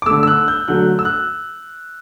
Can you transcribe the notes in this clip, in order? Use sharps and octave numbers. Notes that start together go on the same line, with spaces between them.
D6
D3 A3 E6
E6
F#6
G6
D3 F#3 A3 F#6
E6
F#6